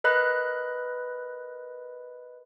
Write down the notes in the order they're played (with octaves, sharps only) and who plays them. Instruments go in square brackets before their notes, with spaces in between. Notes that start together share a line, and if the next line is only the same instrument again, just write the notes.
[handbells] A#4 B4 D#5 B5 F#6